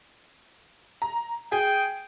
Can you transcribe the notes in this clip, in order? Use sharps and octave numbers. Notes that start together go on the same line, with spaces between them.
A#5
G#4 G5